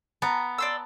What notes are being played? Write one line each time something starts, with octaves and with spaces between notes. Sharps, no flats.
B3 A5 A#5
D5 C6 E6